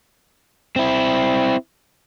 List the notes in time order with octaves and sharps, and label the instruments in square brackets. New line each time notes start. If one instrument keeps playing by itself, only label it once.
[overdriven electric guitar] C4 E4